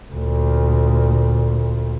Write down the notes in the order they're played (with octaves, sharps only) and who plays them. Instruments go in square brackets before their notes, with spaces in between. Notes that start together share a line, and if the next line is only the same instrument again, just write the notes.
[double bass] D2 A#2